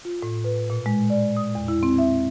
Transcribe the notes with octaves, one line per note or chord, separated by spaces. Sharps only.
F4
A2
B4
A#2
G#3
D5
D#6
E2
E4
C4
E5